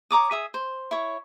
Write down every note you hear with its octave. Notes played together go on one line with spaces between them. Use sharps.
C#5 A#5 D6 D#6
G#4 E5 D#6
C5
E4 C#5